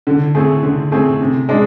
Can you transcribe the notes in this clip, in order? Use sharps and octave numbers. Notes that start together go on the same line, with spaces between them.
D3
A3 C4 G#4
D3
A3 C4 G#4
C3
G#3 D4